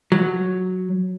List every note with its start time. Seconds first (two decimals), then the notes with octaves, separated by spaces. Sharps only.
0.12 F#3